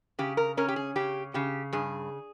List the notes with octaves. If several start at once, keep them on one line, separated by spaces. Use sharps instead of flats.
C#3 G4
A#4
C#4 A#4
G4
G#4
C#3 G4
C#3 G4
G2 G#4